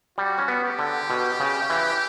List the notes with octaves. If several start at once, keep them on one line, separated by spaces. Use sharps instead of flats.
G3 F#4
C#4
B3
G4
D3
B2
C#3
E3